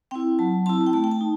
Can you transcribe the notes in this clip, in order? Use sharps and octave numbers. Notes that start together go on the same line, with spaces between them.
C4 E4 G5
F#3 A5
C4 E4 A5
G5
A3 A5
G5
A5
D#4